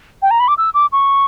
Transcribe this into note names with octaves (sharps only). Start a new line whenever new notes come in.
G5
A#5
B5
D6
E6
D6
C#6